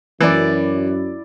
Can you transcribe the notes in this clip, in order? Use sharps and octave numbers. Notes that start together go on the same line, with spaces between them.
F#2 E3 E4 D5